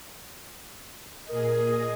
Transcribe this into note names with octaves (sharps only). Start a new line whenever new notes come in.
A#2 G#4 A#4 D#5